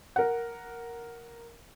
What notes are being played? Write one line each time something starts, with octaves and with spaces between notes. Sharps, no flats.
A#4 F#5